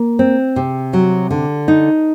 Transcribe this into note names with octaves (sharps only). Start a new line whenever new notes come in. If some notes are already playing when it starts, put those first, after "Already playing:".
Already playing: A#3
C4
C3
F#3
D3
D#4